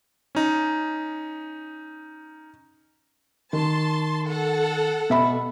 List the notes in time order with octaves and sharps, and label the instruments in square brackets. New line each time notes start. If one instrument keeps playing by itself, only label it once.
[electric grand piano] C#4 D#4
[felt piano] D#3 [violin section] A5 C6
[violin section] A4 F#5
[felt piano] B2 E5 B5